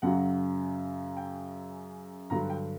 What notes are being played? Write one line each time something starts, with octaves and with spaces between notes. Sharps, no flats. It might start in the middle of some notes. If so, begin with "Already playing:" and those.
F#2 C#3 F#3 F#5
G5
G2 D3 F#3 A#5
G5